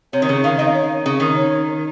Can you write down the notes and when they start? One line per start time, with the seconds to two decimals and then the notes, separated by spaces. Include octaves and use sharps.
0.13 C3 C#5
0.22 D#3
0.29 C#3
0.44 D#3 F5
0.58 D#3 D#5
0.64 F5
0.74 C#5
1.06 C#3
1.20 D#3
1.36 C#5